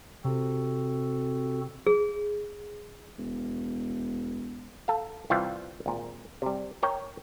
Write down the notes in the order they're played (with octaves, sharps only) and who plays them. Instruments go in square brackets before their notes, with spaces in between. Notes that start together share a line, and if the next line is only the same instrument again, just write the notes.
[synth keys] C3 [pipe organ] C4 F#4 A4
[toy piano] G#4
[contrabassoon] E1
[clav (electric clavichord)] A4 F5
C2 E3 F4 F5 G5
G#1 A#2
C3 G3
A#4 C#5 G5